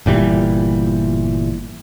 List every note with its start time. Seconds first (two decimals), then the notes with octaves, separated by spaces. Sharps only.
0.06 G1 A#2 E3 G3